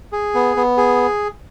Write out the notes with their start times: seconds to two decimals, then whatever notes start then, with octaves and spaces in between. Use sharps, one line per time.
0.12 G#4
0.35 B3
0.56 B3
0.77 G#4